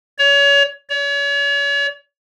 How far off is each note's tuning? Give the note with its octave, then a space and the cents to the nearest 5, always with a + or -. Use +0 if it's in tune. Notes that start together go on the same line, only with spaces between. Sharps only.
C#5 +30
C#5 +40